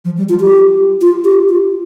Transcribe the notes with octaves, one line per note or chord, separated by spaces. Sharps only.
F3
G3
F4
G4
F4
G4
F4